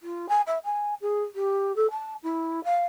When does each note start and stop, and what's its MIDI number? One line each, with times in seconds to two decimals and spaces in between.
0.02 0.26 65
0.28 0.41 80
0.47 0.58 76
0.64 0.94 80
1.01 1.22 68
1.35 1.74 67
1.76 1.86 69
1.91 2.14 81
2.23 2.63 64
2.64 2.85 77